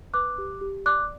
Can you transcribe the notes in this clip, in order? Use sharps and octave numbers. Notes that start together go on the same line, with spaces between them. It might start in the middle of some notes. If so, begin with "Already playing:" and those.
B4 D6 F#6
G4
G4
D5 D6 F#6